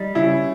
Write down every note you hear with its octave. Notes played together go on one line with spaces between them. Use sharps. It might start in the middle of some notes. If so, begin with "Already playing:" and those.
Already playing: G3 D#4
C#3 E4